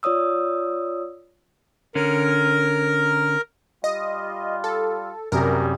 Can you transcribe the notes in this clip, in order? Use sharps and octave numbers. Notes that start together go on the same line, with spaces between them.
F4 C#5 D5 D#6 E6
D3 C#4 A#4
G3 F4 D#5
A4
A1 F#2 C3 G3 G#4 A#4